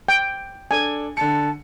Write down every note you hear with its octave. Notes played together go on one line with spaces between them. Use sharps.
G5
D4 A4 G#5
D3 A5 C#7